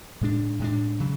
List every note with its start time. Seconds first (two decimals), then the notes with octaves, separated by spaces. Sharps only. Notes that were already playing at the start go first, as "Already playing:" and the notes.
0.21 A2 G#3 D4
0.59 A2 G#3 D4
1.00 C#3 F#3